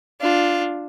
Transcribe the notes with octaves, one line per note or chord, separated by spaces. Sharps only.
D4 F4